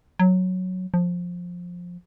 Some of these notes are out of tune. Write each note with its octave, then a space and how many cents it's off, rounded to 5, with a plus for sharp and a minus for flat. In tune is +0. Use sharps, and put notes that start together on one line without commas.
F#3 -5
F3 +15